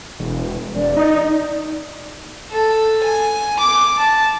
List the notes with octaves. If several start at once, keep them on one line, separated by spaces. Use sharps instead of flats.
E1
E1 D5
D#4
A4
G#5
D6
A5